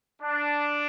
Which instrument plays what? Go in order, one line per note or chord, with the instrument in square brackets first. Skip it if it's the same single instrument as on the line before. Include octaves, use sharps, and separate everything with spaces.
[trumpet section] D4